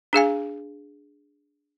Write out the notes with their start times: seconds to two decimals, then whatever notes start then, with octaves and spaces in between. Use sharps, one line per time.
0.13 D4 G#4 F5 G#5